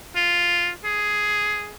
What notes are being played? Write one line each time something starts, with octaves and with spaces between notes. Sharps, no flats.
F4
G#4